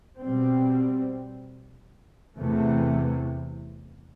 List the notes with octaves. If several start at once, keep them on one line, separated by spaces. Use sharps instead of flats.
B2 G3 C4
E2 C3 E3 A3